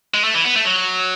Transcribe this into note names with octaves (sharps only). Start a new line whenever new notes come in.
G#3
A3
E3
B3
A3
F#3